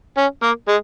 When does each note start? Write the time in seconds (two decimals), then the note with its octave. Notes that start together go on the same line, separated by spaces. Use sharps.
0.18 C#4
0.43 A#3
0.68 G#3